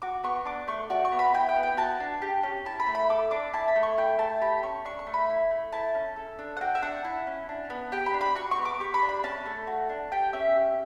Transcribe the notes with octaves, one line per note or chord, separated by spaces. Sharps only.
F#4 D6
B3 C#6
D4 D6
A3 C#6
F#4 D5
C#6
B3
B5
E4 G5
G5
B3
G5
F#4 A5
D4
G4
C#4
E4 A5
B5
A3
B5
A4 D6
D4 D6
E4 A5
B5
A3
C#6
E4 G5
A3 A5
G4 B5
C#4 C#6
D4 C#6
C#6
A3
B5
E4
A3
E4 A5
C#4
A4
D4
F#5
F#4 G5
E5
D4 F#5
E4
C#4
D4
B3
G4 G5
B5
D4
B5
F#4 C#6
C#6
B3
D6
G4 C#6
B5
D4
B5
C#4 A5
A3
F#4
D4
G4 G5
C#4 E5
G4